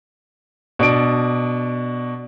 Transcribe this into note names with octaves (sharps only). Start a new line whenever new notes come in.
B2 D4 D7